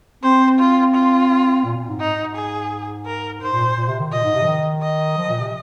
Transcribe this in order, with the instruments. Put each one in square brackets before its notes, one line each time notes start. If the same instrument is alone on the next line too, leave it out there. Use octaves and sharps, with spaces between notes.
[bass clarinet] C4 [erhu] C5
[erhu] F4
F4
[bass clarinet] A#2
A#2
G#2
[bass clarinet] G#2 [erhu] D#4
[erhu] G#4
A#4
[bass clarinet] G#2 [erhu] C5
[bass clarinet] A#2
A#2
C3
D#3
[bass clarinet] A#2 [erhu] D#5
[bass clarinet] G#2
C3
F3
D#3
[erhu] D#5
[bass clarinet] F3
A#2
C3